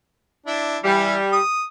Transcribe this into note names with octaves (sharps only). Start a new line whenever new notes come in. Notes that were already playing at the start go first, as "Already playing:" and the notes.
D4 E4
E3 G3 E4
D#6